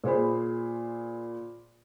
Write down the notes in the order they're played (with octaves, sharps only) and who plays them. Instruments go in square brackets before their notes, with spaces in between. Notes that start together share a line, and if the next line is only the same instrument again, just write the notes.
[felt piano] A#2 G#4 C5 B5